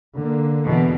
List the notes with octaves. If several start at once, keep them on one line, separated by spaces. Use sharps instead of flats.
D3 A#3
E2 B2